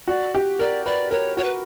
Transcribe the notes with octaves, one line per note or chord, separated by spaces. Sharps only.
F#4 D5
G4
A#4 D5
B4 D5
A#4 C#5
F#4 C#5
B4